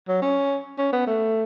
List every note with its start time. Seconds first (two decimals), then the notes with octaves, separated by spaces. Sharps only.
0.08 F#3
0.22 C#4
0.78 C#4
0.93 B3
1.07 A3